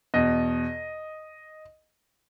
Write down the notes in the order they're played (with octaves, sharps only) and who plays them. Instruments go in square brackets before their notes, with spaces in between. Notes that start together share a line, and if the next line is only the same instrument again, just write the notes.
[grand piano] E2 B2 D#5